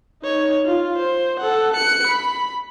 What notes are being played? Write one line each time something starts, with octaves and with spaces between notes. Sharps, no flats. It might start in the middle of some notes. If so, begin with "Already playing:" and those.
D#4 C#5
F4
C5
A4 F#5
F#6 C#7
B5